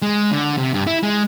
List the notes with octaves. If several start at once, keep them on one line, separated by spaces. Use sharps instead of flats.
G#3
D3
C3
G2
E4
G#3